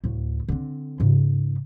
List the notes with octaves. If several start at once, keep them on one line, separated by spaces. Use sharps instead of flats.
D2 A2
D3 C4
G#2 C#3